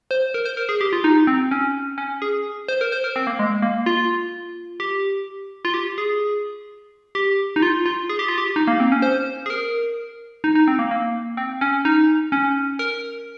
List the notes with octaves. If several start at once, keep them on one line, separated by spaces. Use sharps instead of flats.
C5
A#4
C5
A#4
G#4
G4
F4
D#4
C4
C#4
C#4
G#4
C5
A#4
C5
A#4
C4
A#3
G#3
A#3
F4
G4
F4
G4
G#4
G4
D#4
F4
F4
G#4
G4
F4
G4
D#4
A#3
C4
C#4
C5
G#4
A#4
D#4
D#4
C4
A#3
A#3
C4
C#4
D#4
C#4
A#4